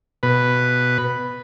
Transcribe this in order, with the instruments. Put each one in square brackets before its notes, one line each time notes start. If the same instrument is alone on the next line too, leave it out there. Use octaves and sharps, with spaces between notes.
[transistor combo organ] B2 B4